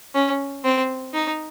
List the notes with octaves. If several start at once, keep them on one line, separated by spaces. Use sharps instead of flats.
C#4
C4
D#4